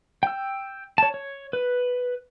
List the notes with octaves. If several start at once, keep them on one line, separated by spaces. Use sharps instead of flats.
G5 E6
C#5 A5
C#5
B4